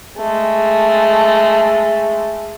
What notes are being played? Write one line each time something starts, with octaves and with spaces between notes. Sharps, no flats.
G#3 A3